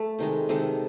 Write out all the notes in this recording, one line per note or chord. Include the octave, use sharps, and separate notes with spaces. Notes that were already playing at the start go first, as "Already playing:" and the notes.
Already playing: A3 A4
C3 D#3 G#3
C3 D#3 G#3 A4